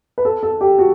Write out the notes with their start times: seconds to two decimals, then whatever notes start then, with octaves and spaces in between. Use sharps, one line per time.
0.18 B4
0.25 A4
0.43 A4
0.61 G4
0.79 F#4